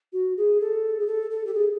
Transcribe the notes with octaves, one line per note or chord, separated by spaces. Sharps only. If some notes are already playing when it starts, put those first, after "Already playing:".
F#4
G#4
A4
G#4
A4
A4
G4
G#4